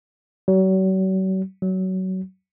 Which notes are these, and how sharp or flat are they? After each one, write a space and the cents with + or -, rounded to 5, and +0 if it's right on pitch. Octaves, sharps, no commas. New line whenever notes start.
F#3 +40
F#3 +20